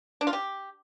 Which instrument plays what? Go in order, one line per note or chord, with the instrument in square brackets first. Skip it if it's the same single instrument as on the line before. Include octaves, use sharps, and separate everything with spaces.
[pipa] D4
F4
G4